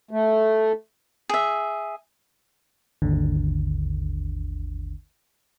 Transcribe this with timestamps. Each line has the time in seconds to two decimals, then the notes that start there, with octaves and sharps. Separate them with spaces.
0.11 A3
1.29 G#4 E5
3.02 G#1 D#2 D3